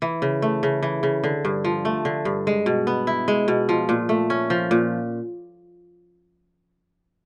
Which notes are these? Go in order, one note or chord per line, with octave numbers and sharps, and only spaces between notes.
E3
C#3
A3
C#3
E3
C#3
D3
G2
F3
A3
D3
G2
G#3
B2
B3
E4
G#3
B2
F3
A#2
A3
C#4
F3
A#2